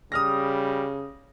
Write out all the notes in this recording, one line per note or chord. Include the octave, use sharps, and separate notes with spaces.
C#3 G3 D#6 F6 A#6